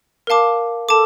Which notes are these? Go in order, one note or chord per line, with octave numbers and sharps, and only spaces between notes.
A#4 F5 A5 D6
A4 A5 D6